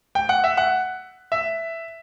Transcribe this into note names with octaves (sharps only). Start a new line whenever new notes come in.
G5
F#5
E5
F#5
E5